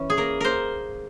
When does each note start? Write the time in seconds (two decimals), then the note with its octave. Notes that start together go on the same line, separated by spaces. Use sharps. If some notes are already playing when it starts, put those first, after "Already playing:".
Already playing: E3 C#4
0.10 G#4
0.17 A#3 A#4
0.40 A#3 A#4 C5